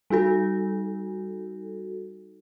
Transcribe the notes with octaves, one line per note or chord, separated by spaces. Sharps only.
G3 D#4 F#4 A4